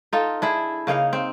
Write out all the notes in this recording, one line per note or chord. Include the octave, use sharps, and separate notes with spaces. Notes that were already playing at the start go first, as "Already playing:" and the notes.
D#4 F4 A4
D4 E4 G#4
C#3 A#3 D#4 F5
C4